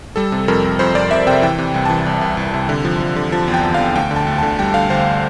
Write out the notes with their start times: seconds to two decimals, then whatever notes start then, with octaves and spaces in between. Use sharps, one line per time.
0.16 G3 A4
0.32 C3
0.48 F2 A#4
0.64 F2
0.79 F2 C5
0.95 F2 D5
1.11 F2 E5
1.27 C3 G5
1.42 E3 G5
1.59 C3
1.74 C2
1.85 E3 A5
2.06 C2
2.21 C2
2.37 C2
2.54 C3
2.69 D3
2.85 F3
3.00 F3
3.16 D3
3.32 F3 A5
3.48 E2
3.54 G5
3.64 F3
3.74 F5
3.80 E2
3.95 D2 G5
4.11 D3
4.16 A5
4.27 D2
4.38 D3 A5
4.59 G3 G5
4.74 D3 F5
4.90 D2 C5